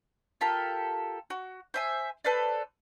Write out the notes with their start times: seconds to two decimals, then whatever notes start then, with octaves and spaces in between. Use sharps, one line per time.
0.41 F4 G4 A4 A#4
1.30 F#4
1.74 C5 E5 G#5
2.24 A4 B4 C5 D5